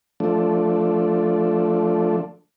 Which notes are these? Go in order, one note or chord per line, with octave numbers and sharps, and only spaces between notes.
F3 A3 D4